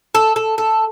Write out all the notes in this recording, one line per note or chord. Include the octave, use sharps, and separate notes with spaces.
A4
A4
A4